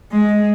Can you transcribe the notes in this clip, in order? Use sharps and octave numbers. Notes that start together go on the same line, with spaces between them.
G#3